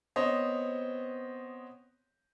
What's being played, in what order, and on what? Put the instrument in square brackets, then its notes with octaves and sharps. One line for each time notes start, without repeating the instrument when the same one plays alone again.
[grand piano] B3 C4 C5 C#5 D#5